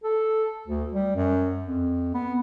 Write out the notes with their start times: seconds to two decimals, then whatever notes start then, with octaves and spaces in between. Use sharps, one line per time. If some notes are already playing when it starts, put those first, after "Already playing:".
0.04 A4
0.68 D2
0.93 G3
1.16 F#2
1.64 F2
2.14 B3